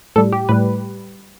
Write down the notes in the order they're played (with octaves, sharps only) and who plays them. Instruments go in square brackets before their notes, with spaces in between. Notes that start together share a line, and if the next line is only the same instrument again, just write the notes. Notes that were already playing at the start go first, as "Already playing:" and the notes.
[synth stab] A2 G3 A4
G4
A2 G3 B4